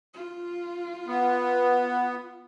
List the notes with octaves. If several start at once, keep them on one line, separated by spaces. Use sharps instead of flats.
F4
B3